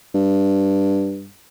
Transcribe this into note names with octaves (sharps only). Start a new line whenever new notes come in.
G2